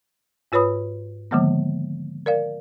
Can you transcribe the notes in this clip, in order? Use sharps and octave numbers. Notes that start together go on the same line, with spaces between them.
G#2 F4 B4 C#5 B5 D#6
D3 D#3 F3 G#3 A#3 B3
A#4 D5 F5